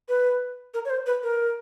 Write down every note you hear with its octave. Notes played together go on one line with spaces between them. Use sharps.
B4
A#4
C#5
C5
B4
A#4